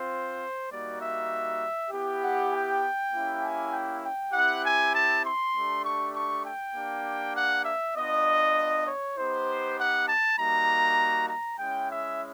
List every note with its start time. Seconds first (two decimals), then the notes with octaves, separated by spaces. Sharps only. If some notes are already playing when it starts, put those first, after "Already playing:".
Already playing: C4 F4 C5
0.70 G3 A#3 D#4 F#4 D5
1.01 E5
1.91 B3 E4 G4
2.21 F#5
2.52 G5
3.12 A#3 C#4 E4 G4
3.43 G#5
3.72 G5
4.03 G5
4.33 C4 E4 G4 F#5
4.64 G#5
4.93 A5
5.24 C6
5.54 A3 D4 G4
5.85 C#6
6.14 C#6
6.45 G5
6.75 A#3 D4 G4
7.36 F#5
7.65 E5
7.95 B3 D4 F4 D#5
8.86 C#5
9.17 B3 D#4 G4 C5
9.78 F#5
10.08 A5
10.38 G3 A#3 D#4 F#4 A#5
11.28 A#5
11.59 G#3 C#4 E4 G5
11.89 E5